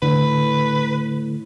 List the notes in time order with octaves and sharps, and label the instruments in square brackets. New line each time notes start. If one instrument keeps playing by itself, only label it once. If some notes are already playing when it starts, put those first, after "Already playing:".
[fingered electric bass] A2 [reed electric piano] D3 [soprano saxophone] B4